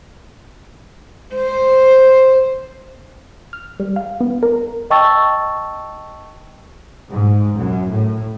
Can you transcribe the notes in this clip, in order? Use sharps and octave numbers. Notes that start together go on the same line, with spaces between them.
C5
F6
G3
F5
B3
A#4
D#5 G5 A5 C#6 E6 A6
G#2
F#2
A2